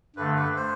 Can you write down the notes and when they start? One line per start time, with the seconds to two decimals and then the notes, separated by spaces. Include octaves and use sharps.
0.16 G2 D3 A3 B4
0.36 B4
0.56 C5